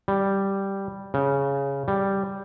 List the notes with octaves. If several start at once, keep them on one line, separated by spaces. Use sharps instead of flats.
G3
C#3
G3